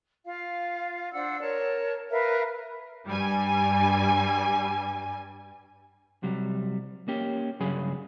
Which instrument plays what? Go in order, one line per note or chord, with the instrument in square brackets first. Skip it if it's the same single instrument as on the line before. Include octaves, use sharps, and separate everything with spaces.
[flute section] F4 F5
D4 C5 F#5 E6
A#4 C#5 A5
A#4 B4 E5 F5
[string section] G2 G3 G#5
[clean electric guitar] C3 F#3 G3
A#3 C#4 G4
G2 C#3 F#3 G#4 G#5 B5